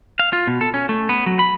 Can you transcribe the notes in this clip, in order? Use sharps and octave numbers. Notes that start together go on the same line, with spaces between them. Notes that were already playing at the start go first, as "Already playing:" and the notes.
F5
F4
B2
A4
C#4
A3
B3
F#3
B5